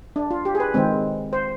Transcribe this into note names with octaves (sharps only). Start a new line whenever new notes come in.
D4
F4
G4
G#4
B4
D#3 G#3 C4
C5